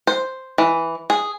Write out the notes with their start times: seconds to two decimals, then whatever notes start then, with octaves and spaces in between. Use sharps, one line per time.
0.07 C5
0.58 E3
1.10 G#4